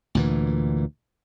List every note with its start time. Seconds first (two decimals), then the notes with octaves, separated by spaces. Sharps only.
0.15 D2 A#2 E3